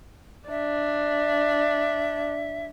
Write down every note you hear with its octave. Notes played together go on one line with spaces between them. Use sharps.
D4 E5